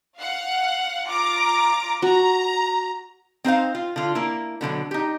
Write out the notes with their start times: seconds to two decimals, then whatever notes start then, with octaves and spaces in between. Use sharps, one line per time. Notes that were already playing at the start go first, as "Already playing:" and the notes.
0.19 F5 F#5
1.06 F4 A#5 D6
2.02 F#4 A#5
3.44 C4 D#4 C5 F5
3.75 F4
3.96 D3 F4
4.15 A#3 E4
4.61 B2 D3 F3 F#3
4.91 D#4 G4